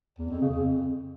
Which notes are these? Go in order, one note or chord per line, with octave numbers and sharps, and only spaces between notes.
E2
F2
C#3
F2